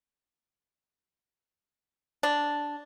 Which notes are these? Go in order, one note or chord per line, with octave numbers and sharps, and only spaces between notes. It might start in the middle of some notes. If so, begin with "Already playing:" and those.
D4